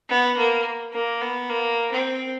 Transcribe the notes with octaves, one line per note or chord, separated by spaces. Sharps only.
B3
A#3
A#3
B3
A#3
C4